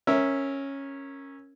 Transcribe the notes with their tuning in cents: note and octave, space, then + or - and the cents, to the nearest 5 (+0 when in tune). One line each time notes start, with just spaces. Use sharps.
C#4 -10 A#4 +0 E5 -10